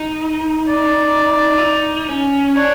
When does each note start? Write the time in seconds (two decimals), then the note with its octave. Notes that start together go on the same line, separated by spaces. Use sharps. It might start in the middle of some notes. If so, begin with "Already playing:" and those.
Already playing: D#4
0.68 D5
1.58 E4
1.62 D#4
2.09 C#4
2.55 D4 C#5